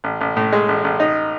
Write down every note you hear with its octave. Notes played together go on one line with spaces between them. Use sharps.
A1
A1
A2
G#3
A1
A1
D#4